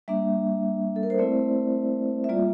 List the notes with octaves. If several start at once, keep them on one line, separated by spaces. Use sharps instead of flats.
G3 A#3 D4 E5
A4
A#4
C5
A3 C4 E4 D5
E5
G3 A#3 F4 D5